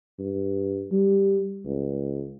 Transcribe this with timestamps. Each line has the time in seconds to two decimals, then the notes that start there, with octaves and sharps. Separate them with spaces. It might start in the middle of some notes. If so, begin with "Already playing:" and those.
0.19 G2
0.92 G3
1.65 C#2